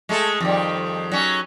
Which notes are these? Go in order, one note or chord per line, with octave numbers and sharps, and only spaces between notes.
G#3 A3 A4
F2 D#3 G3
F#3 C#4